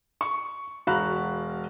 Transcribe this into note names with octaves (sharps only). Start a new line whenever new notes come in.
C#6
E1 F#4 F5 A#5 B5 F#6